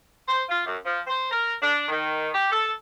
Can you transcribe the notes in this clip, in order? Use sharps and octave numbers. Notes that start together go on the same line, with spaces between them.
C5
F4
F#2
F3
C5
A#4
D4
D#3
G4
A4